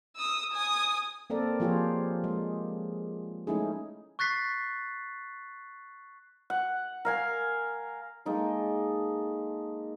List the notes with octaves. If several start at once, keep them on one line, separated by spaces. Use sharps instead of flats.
D#6 E6
G#5 D#6
A#3 C4 A4 A#4 D5
F3 A#3 F4 G4 G#4 C#5
G#3
G#3 A3 C#4 D#4 E4 G#4
C#6 F#6 A6 B6 C7
F#5
A#4 F5 G#5
G#3 A#3 D#4 A4